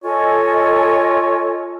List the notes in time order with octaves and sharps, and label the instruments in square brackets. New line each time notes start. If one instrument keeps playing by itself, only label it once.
[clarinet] F4 [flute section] A4 D#5 G#5 [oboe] C#5